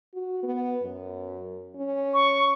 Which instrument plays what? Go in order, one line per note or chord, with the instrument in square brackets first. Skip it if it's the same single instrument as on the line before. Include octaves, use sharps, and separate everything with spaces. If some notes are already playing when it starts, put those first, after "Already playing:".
[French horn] F#4
B3
F#2
C#4
[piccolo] C#6